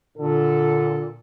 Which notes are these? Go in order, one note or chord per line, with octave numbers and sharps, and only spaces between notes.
A#2 D3 A4